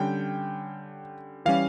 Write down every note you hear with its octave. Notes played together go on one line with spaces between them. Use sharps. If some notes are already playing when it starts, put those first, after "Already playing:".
Already playing: D3 G3 C#4 G5
E3 G3 C#4 F5